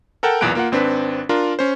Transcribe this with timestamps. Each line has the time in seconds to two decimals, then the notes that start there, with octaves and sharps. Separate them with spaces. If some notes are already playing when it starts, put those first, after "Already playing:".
0.23 A4 A#4 F#5 G5 A5
0.41 B1 E2 A#2 B3 F#6 D7
0.55 A#3 F4 F#5
0.72 G#1 C4 D4 B4 B6
1.29 D4 F4 A#4
1.59 C#4 C5